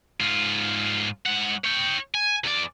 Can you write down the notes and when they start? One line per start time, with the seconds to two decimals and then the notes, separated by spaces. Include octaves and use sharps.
0.20 G#2 F4
1.26 G#2 F#5
1.64 C#5 G5
2.14 G#5
2.44 E2 D5